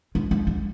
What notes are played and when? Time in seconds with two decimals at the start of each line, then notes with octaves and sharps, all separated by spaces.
0.15 G#3
0.31 G#3
0.47 G3